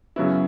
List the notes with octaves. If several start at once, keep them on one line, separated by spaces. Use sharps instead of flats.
F#2 C#3 F#3 B3 E4